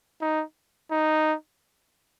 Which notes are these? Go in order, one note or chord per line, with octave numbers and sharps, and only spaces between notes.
D#4
D#4